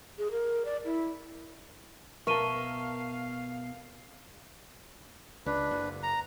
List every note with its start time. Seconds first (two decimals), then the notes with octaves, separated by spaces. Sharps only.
0.18 G#4
0.31 A#4
0.65 D5
0.85 E4
2.27 B2 A#4 E5 F5 A5 C#6 D#7 G7
5.46 C#2 D4 B4
5.71 F#1
6.03 A#5